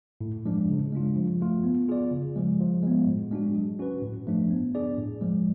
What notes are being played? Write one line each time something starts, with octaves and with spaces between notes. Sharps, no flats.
A2
F3 G#3 D4
C#3
G#3 D4 F4
F3
A3 F4
B3
F4 G#4 D5
C#3
F3 G#3
F3
G#3 B3
A2
G#3 D4 F#4
F#3
C#4 F#4 B4
A2
F3 A3 D4
B3
D4 G#4 D5
A2
F3 G#3